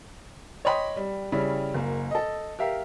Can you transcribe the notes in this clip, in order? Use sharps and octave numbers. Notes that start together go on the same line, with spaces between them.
C#5 D#5 G5 B5 C6 D#6
G3
C#3 G3 C#4 E4
F#1 A#3
A4 D#5
G4 A#4 E5 F5